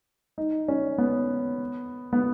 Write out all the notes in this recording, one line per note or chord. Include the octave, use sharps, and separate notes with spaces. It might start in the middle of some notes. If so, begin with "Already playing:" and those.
D#4
C#4
B3
B3